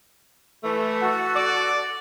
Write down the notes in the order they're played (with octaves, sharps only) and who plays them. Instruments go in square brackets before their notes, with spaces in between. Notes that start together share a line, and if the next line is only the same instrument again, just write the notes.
[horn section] E3 A3
[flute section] F#4 A4
[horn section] D5